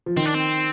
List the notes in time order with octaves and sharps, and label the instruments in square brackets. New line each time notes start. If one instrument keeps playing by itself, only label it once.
[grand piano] F3
[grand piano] D#3 [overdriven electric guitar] C4
[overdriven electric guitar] D4
C4